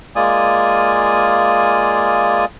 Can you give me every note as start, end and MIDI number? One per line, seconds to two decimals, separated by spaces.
0.16 2.45 56
0.16 2.45 58
0.16 2.45 65
0.16 2.45 74
0.16 2.45 80
0.16 2.45 87